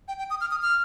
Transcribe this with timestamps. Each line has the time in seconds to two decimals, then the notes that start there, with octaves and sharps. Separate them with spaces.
0.08 G5
0.19 G5
0.30 D#6
0.41 F6
0.51 D#6
0.62 F6